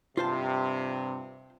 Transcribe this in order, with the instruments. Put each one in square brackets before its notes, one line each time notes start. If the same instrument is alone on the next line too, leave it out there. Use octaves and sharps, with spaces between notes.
[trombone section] G2 C3 [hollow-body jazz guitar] F4 C5 A5